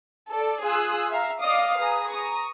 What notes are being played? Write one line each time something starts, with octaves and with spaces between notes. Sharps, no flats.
A4 D5
F4 G#4 D#6 E6 F#6
E5 F5 A#5
D5 D#5 F5 D6 D#6
G#4 B4 A#5 D#6
A#5 C#6 D#6